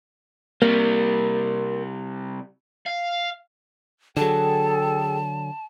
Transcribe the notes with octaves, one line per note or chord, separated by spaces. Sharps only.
C3 G3 A#3
F5
D3 F#3 G#4 A4 G5 A5